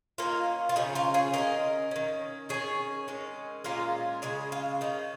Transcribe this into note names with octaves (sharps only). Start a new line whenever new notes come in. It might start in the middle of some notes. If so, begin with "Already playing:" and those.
D#3 A#3 C#4 F4 A#4
F4
C#3 F3 C#4 D#4 G#4
F4 A#4
G#4 C#5
D#3 A#3 C#4 A#4 D#5
D#3 C#4
D#3 C#4 G#4 C#5
D#3 G#3 C#4
A#2 G#3 C#4 F4 A#4
C#3 G#3 C#4 D#4 G#4
F4
D#3 C#4 D#4